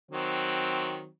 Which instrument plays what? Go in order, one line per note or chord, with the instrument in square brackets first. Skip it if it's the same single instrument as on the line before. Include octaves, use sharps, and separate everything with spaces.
[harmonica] D#3 F#3 C4